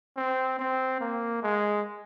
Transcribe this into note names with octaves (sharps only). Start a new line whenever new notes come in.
C4
C4
A#3
G#3